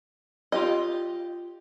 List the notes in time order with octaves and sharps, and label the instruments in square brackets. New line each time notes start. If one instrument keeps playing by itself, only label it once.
[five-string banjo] F4 G4 D#5